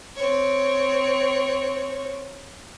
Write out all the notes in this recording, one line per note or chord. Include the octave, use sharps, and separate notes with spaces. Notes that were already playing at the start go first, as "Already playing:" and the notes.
C4 C#5